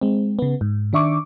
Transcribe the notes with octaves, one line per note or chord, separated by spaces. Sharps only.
G#3 C4
C#3 B3
G#2
D#3 D4 E5 C#6 D6